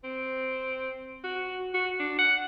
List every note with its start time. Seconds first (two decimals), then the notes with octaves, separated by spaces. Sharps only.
0.04 C4
1.24 F#4
1.74 F#4
1.99 D4
2.18 F#5